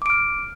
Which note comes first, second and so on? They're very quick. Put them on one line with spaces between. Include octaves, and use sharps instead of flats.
D6 D7 F6